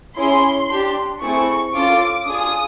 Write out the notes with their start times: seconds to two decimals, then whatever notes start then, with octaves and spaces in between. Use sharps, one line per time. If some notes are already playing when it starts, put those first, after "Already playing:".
0.17 C#4 E4 G#4 C6
0.69 D4 G4
1.21 A3 C4 E4 G#4 C#6
1.73 C#4 F4 A4 D6
2.25 D4 F4 G#4 D#6